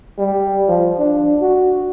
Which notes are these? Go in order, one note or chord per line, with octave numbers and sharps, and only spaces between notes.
G3
F3
D4
F#4